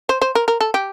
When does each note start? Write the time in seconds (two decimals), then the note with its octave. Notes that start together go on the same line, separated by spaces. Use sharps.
0.09 C5
0.21 C5
0.35 A#4
0.48 A#4
0.61 A4
0.74 G4